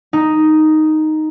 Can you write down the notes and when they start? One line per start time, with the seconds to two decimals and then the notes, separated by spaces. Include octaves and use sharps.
0.13 D#4